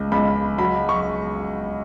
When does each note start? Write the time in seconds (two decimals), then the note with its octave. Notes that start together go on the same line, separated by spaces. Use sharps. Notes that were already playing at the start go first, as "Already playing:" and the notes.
Already playing: C#2
0.12 C#2 B5
0.58 F#3 B5
0.89 C#6